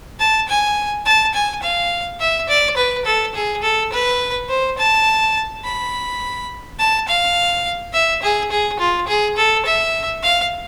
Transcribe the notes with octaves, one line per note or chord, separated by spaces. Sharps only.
A5
G#5
A5
G#5
F5
E5
D5
B4
A4
G#4
A4
B4
C5
A5
B5
A5
F5
E5
G#4
G#4
F4
G#4
A4
E5
F5